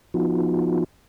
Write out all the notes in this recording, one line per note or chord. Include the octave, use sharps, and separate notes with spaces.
F3 B3 D#4 F4 F#4